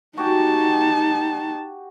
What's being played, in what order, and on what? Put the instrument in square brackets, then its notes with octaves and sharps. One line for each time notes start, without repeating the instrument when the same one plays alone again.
[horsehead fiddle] D#4 A5 [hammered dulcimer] F#4 G4 G#5